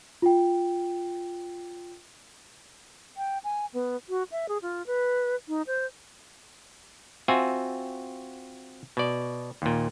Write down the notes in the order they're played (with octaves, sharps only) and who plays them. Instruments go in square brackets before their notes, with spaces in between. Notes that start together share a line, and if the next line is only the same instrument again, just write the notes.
[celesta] F4 G5
[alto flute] G5
G#5
B3
F#4
E5
G#4
F4
B4
D#4
C5
[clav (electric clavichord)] C4 F4 F#4 E5 G#5
B2 D5
D#2 A#2